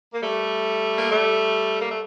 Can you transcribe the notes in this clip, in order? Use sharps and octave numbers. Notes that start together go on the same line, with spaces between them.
A#3
G3 A3
A#3
G3 A3
A#3
A3